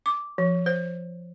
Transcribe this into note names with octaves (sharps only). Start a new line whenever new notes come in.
D6
F3
C5